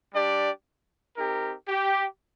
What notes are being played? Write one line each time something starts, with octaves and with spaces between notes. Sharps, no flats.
G3 D4 G4 D5
C4 D#4 G4 A#4
G4